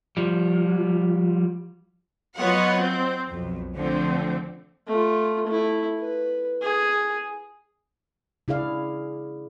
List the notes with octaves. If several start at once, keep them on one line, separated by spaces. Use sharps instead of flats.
F3 G3
F#3 B3 F4 C#5 D#5 F#5
C4
B1 F2
D3 F3 A3 C4
A3 F4
A3 E4
B4
G#4
C#3 E4 G#4 D5 F5